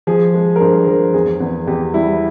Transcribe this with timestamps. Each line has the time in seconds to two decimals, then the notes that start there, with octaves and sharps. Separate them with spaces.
0.07 F3 G#4
0.34 G#3
0.56 A#4
0.61 G2 C5
0.87 F3 A#4
1.14 E2 G#4
1.40 E2
1.67 E2 G4
1.94 G3 E4